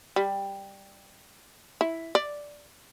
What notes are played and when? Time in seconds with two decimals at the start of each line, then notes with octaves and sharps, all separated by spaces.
0.16 G3
1.81 E4
2.15 D5